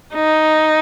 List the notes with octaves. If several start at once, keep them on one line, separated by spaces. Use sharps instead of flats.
D#4